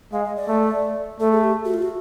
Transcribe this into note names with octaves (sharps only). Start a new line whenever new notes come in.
G#3 F5
D#5
D5
A3
A3 A4
G#4
G4
F#4
F4
F#4